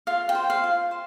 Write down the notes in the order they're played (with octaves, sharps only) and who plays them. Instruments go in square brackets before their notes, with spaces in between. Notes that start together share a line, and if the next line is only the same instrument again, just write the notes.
[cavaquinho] F4 F5
G5
C5
F5
F4
C5